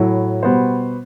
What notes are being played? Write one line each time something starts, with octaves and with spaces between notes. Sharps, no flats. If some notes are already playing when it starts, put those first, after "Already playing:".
Already playing: A2 F#3 A3 E4
B2 G3 B3 F#4 C5